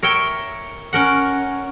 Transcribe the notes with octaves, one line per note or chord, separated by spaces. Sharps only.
A#4 C#5 E5 G5
C#4 A#4 F#5